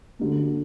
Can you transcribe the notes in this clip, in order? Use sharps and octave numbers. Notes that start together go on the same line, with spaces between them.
D2 D3 A#3